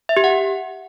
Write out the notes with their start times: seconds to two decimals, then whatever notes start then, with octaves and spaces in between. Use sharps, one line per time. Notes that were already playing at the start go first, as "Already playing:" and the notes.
0.09 E5
0.17 G4
0.24 F#5